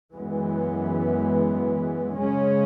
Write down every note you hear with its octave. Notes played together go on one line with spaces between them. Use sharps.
F#2 E3 G#3 B3
C#3 G#3 C#4